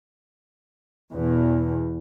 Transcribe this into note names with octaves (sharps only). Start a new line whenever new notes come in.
E2 B2